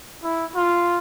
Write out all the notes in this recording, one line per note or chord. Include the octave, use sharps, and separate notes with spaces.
E4
F4